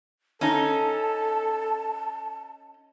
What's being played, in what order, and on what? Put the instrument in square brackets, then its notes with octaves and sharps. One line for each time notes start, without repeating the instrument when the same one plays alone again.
[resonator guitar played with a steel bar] C#4 D#4 [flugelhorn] A4 [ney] A5